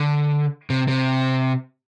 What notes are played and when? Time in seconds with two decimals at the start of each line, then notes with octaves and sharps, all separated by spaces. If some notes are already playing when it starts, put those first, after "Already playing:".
Already playing: D3
0.70 C3
0.88 C3